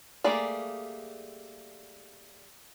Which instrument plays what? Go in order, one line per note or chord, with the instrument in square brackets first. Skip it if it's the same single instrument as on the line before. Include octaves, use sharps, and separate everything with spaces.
[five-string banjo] G3 A3 A#3 G#4 D5